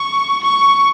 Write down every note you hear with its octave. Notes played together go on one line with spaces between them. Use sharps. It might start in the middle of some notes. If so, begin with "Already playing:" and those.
Already playing: C#6
C#6